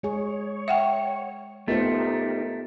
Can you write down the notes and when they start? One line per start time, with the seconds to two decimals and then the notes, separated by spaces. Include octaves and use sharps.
0.03 G#3 G#4 C#5
0.68 E5 F#5 G5
1.68 A3 B3 D#4 F4 G4 A#4 C5